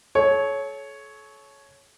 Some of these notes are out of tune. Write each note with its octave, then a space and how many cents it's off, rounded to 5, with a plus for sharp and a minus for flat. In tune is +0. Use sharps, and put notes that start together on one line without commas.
A4 -40 C#5 +0